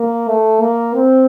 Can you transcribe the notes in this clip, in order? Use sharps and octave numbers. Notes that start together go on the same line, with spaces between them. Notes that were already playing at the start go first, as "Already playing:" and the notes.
Already playing: A#3
A3
A#3
C4